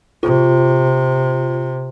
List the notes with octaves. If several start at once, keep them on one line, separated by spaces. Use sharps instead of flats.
C3 F4